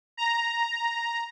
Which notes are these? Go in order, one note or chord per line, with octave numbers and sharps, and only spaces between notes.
A#5